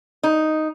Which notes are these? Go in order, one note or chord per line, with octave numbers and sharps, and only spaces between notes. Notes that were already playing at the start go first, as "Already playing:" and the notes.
D#4